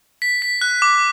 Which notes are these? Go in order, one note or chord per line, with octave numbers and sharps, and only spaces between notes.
B6
B6
F#6
D6